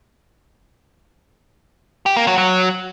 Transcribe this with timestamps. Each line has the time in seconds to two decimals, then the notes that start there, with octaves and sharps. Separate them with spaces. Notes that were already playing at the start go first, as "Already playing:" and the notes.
2.06 G4
2.16 A#3
2.27 F#3
2.38 F#3